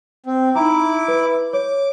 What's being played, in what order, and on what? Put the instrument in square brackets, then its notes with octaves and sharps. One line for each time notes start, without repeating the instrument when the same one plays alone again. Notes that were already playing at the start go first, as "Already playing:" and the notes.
[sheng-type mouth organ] C4
[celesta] D#4 A#5 [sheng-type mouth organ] E4 D6
[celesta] B4
[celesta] C#5 [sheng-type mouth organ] D6